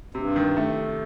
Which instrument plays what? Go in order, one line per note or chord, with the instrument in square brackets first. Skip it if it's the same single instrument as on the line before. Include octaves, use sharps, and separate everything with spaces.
[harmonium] G2 [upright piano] C3
[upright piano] D#3
A3